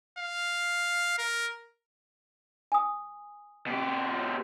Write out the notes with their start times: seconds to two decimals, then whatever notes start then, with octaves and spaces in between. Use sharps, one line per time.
0.19 F5
1.18 A#4
2.72 G#5 D#6
3.67 B2 G4